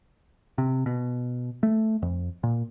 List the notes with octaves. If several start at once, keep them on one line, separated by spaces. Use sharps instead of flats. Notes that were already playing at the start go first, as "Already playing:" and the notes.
C3
B2
A3
F2
A#2